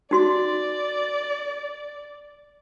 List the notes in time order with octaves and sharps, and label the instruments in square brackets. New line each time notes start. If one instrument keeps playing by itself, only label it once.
[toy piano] D#4 F#4 C6 [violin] D5